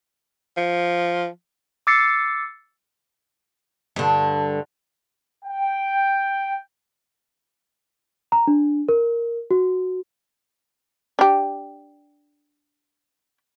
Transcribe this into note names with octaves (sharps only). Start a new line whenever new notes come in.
F3
D6 E6 A6 C7 C#7
G2 D3
G5
A#5
D4
A#4
F#4
D4 G4